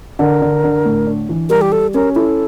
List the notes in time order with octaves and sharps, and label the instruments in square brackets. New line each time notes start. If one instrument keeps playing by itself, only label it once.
[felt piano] D3 [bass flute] A#4
[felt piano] D3
D3
A2
D4
E3
[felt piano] G3 [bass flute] A#4
[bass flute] G4
[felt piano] G4 [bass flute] A4
[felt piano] C#4 [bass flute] A#4
[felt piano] E4 [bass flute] A4